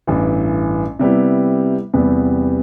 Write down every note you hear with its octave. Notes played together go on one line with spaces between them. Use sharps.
A1 G2 E3
C3 G3 B3 E4
E2 C3 G3 B3